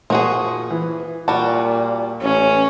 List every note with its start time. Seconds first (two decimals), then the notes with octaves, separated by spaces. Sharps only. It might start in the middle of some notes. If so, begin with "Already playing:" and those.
0.10 A#2 F3 F#4 G#4
0.71 E3
1.28 A#2 G3 F#4 A5
2.21 A1 C#4